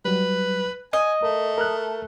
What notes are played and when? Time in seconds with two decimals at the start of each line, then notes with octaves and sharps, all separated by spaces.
0.05 F#3 G3 B4
0.93 D#5 G#5 D#6
1.22 A3 A#4
1.58 A#4 F6 F#6